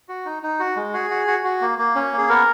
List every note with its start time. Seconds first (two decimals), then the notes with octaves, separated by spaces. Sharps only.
0.09 F#4
0.26 D#4
0.43 D#4
0.60 F#4
0.76 G#3
0.94 F#4 G#4
1.10 F#4
1.27 F#4
1.44 F#4
1.61 A#3
1.78 A#3
1.95 C#4
2.12 A#3
2.18 G#4
2.29 B3 A#4